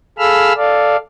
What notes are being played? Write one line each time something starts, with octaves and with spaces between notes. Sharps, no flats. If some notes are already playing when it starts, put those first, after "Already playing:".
G#4 A4 F5 B5 E6 F6
A4 D5 F5